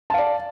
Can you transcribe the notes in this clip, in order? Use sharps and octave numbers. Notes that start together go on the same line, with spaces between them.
D5 F5 A5